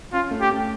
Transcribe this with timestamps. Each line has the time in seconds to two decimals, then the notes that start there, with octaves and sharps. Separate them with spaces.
0.13 C#4 F4
0.31 A3
0.41 G4
0.51 A3